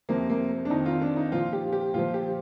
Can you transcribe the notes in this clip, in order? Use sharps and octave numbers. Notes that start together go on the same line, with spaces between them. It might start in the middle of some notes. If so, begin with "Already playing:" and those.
F2 C3 F3 A#3
A#3
D4
F2 D#3 D#4
F4
D4
D#4
A#2 F3 F4
G4
G4
A#2 F3 F4
G4